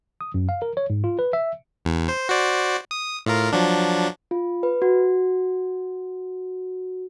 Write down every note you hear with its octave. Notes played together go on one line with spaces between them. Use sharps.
D#6
F#2
F5
A#4
C#5
G#2
F4
B4
E5
E2
C5
F#4 C5 D5
D#6
A2 F4 A#4
F3 F#3 D4
F4
B4
F#4